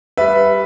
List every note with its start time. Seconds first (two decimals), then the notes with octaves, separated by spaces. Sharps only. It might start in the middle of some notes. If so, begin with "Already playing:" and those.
0.17 G3 B4 E5